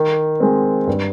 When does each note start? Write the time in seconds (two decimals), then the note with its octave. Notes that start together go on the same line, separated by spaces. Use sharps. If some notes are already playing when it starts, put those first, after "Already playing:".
Already playing: D#3
0.40 G#3 C4
0.87 G2